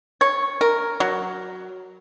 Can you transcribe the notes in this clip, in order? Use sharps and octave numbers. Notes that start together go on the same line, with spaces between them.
C#5
A#4
F#3